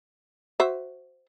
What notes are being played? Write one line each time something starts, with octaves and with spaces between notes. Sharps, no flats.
F#4 C5 E5